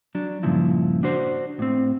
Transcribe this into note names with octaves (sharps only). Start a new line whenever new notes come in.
F#3 D4
G2 A#2 C#3 F3 E4
D4 F#4 C5
A2 C4